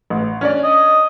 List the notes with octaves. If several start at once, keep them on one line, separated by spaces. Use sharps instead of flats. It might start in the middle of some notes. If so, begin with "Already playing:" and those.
A1
C#4 D4 D5
D#5